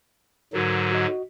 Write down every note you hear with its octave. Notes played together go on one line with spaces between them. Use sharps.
G#2 D3 F#3 F#4 A#4
F#4 D#5